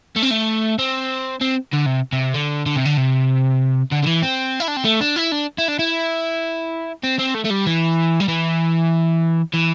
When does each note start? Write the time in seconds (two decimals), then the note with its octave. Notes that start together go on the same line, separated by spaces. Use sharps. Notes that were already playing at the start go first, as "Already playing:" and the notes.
0.16 A3
0.23 C4
0.31 A3
0.79 C4
1.41 C4
1.73 D3
1.86 C3
2.13 C3
2.34 D3
2.66 D3
2.76 C3
2.85 D3
2.97 C3
3.91 D3
4.02 D3
4.06 E3
4.22 C4
4.60 E4
4.68 D4
4.77 C4
4.85 A3
5.01 D4
5.16 E4
5.32 D4
5.58 E4
5.68 D4
5.79 E4
7.04 C4
7.19 C4
7.35 A3
7.45 A3
7.50 G3
7.67 E3
8.20 G3
8.28 E3
9.53 E3